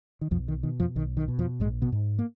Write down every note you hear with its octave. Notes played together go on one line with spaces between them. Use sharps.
D#3
B1 F2 F3
D#3
B2 D#3
F2 F3
B1 D#3
D#3
B2
F2 F3
A#1 G#2 G#3
B2 B3
G#2
A#3